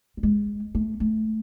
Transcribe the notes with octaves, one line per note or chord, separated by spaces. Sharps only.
G3
G#3
A3
A3